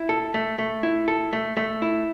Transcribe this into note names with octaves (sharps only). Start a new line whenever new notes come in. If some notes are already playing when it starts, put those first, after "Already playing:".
Already playing: E4
A4
A3
A3
E4
A4
A3
A3
E4